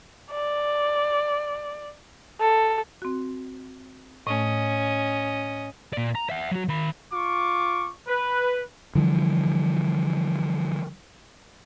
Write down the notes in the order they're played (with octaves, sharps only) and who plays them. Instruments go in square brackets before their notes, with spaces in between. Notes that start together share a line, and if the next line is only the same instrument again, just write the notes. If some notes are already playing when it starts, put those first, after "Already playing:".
[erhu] D5
A4
[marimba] C4 F#4
[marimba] A2 A3 [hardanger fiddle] C#4 D#5
[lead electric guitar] A#2 D5
A#5
E5 F#5
F#3 F#4
D#3 B5
[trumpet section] F4 C#6 D6
B4
[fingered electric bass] D3 E3 F3 G3